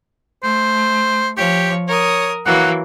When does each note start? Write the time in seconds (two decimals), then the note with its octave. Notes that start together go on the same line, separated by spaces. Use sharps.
0.43 A3 C5
1.37 F3 G4 C#5
1.88 A#4 C#5 D#6
2.46 E3 F#3 A#3 F#5